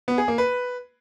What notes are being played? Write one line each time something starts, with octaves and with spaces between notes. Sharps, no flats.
B3
G#4
A#3
B4